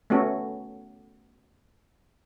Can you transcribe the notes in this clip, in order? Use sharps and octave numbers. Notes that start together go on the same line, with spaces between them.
A3 B3 C#4 F#4 A4